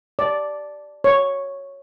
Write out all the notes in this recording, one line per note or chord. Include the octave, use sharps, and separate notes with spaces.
D5
C#5